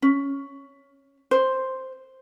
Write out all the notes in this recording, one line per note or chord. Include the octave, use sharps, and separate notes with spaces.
C#4
C5